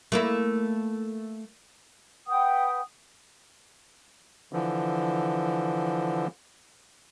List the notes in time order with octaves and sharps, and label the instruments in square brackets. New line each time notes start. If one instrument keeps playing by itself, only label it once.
[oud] A3 A#3 E4
[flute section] B4 F#5 G5 D#6
[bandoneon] D3 E3 F3